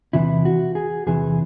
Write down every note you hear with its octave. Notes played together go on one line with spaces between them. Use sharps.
E2 C3 E3 E4
F#4
G#4
E2 C3 E3 G#4